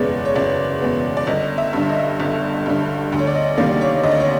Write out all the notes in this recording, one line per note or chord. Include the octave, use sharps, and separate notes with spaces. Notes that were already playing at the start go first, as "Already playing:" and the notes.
Already playing: F#1 E2 B2 G#3 B3 C#5 D5
C#5
F#1 D5
E2 B2 G#3 B3
D5
G1 D#5
E5
G2 D3
D#5
G1
G2 D3
D2
C#5
D5
D#5
C3 D#3 G3 A#3 D5
C#5
D2 D#5
D5
C#5